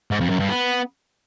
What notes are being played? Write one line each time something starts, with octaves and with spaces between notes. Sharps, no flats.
G#2
F2
F#2
G2
B3